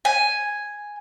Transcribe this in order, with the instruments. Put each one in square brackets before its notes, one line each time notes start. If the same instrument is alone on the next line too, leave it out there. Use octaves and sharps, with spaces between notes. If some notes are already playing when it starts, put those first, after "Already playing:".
[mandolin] G#5